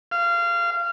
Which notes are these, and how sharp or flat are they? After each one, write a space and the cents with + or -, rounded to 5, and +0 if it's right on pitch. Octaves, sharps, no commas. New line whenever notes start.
F5 -20